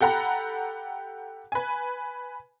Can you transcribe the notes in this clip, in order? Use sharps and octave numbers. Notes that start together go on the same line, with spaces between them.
G4 A4 F#5 A#5 B5
B4 G#5